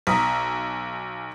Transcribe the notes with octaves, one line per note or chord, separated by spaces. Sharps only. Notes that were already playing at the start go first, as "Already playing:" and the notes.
B1 A#5 D#6 B6